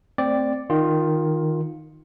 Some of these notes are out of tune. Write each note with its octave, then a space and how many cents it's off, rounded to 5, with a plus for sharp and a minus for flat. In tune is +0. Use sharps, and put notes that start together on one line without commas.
A3 +25 C4 +0 D5 +0
D#3 +0 F4 +15